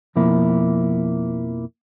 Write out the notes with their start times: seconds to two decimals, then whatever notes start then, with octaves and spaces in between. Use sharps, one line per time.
0.16 F2 B2 F3 A#3 E4